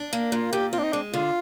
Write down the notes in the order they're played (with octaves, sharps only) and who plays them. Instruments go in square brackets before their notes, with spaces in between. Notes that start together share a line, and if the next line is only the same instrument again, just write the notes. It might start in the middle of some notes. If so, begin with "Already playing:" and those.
Already playing: [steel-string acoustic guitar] D4
A#3
[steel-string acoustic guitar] A#2 [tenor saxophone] F4
[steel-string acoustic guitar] A#2 [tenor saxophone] G4
[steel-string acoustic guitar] C4 [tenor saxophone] F4
[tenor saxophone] D4
D#4
[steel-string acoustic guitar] G#3 [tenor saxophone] D4
[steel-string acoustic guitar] D3 [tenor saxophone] F4